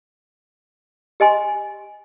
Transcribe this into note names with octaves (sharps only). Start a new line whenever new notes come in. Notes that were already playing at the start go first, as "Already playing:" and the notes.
G4 D#5 G#5 C6